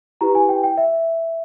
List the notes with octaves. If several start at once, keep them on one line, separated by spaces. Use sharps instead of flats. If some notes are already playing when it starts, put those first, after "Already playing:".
E4 G4 B4 A#5
G#5
G5
G5
E5